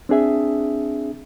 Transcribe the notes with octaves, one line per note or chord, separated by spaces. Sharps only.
C4 D4 G#4 E5